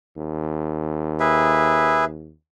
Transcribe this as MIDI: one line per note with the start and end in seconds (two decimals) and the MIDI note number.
0.17 2.33 39
1.20 2.05 68
1.20 2.05 71
1.20 2.05 76